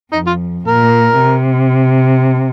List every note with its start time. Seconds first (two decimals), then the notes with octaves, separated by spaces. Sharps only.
0.12 F2 D#4
0.27 F4
0.67 A#2 A#4
1.22 C3